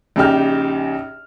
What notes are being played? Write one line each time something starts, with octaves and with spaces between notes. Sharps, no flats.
A#1 C#3 D#4 G4 F6